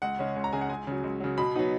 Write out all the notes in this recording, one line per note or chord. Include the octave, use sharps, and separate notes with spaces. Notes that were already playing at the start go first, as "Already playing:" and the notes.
C#2 F#5
C#3 G#3 C#4
C#2
A#5
C#3 G#3 C#4 G#5
F#5
C#2 G#5
C#3 F#3
C#2
C#3 F#3
B2 B5
F#3 B3 D#4